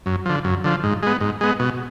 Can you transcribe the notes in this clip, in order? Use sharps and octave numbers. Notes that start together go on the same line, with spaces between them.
F#2
D3 F3
F#2
D3 F3
G#2
G#3 B3
G#2
G#3 B3
B2